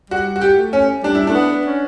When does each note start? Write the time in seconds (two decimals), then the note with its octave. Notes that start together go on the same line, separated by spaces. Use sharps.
0.10 G3 F#4
0.36 F#4
0.41 G4
0.57 A3
0.73 C#4
1.03 G3 D4
1.15 E4
1.27 A3 D4
1.34 B3
1.66 C#4